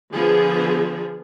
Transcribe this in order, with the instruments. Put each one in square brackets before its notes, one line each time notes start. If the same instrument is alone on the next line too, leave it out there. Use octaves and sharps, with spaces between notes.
[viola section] D3 F3 B3 G#4